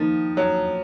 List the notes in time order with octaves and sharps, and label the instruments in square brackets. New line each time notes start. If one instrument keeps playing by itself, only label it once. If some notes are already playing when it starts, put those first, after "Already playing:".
Already playing: [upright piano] D#3 A#3 D#4 [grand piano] F3
[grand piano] F#3